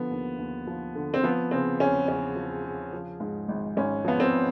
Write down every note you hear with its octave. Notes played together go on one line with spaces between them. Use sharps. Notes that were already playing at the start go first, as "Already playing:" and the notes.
Already playing: D3 F3 B3
D#2
D#2
F3
D3
C4
F3 B3
C#3 C4
E2 C#4
E2 C#4
F3
C#3
F3
G#2
G#1
G#1 C#4
F3 B3
C4